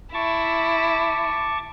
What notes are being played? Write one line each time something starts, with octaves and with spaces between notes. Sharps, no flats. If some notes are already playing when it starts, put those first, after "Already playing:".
E4 A5 C#6 D6